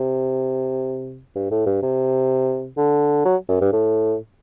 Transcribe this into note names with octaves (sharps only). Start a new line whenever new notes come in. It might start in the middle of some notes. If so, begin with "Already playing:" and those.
Already playing: C3
G2
A2
G2
C3
D3
F#3
F#2
G2
A2